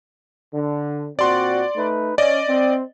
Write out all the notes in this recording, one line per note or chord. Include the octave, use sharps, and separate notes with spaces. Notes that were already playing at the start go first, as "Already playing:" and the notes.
D3
A#2 C4 F#4 D5 C6
A3 D#4 B4
C#4 D5 D#5
C4